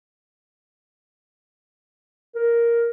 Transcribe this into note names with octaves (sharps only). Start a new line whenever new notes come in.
A#4